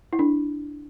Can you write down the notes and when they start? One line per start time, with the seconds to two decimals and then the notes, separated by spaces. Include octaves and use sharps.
0.13 E4
0.19 D4